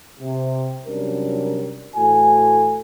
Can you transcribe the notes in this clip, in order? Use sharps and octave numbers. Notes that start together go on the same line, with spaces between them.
C3
C3 F#3 G3 C#4 D4 A#4
A2 E3 F#4 A4 G#5